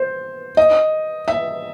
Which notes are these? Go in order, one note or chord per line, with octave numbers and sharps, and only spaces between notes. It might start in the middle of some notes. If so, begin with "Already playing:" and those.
Already playing: C5
D#5
E5